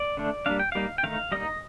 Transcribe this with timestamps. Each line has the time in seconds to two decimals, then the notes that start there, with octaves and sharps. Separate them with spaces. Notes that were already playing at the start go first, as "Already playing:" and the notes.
Already playing: D5
0.17 D3 A3 D4
0.46 G3 A#3 D4 F5
0.59 G5
0.72 G3 A#3 D#4 F5
0.98 G5
1.03 D#3 A3 D#4 F5
1.32 G3 A#3 D#4 D#5